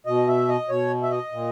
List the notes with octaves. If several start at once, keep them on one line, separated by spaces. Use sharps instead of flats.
B2 D#5
E5
D#5
B2 C#5
E5
D#5
A#2